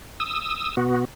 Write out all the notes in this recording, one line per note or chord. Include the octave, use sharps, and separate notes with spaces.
D#6 E6
B2 B3 F#4